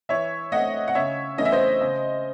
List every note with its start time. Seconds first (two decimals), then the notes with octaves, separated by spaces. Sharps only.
0.09 E3 C#5 E5
0.52 A3 C4 D#5 F#5
0.88 F#5
0.95 C#3 C#5 E5
1.38 E3 A3 C#4 D#5
1.45 E5
1.52 C5 D#5
1.81 C#3